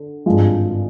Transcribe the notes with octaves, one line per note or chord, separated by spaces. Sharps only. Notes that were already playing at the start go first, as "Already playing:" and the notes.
Already playing: D3
G#1 G2 F3 G#3